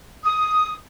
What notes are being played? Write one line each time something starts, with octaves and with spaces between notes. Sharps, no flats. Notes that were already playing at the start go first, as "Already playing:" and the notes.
D#6